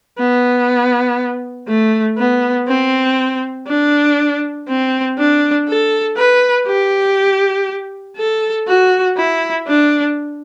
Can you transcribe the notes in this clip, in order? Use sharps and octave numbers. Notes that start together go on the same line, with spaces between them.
B3
A3
B3
C4
D4
C4
D4
A4
B4
G4
A4
F#4
E4
D4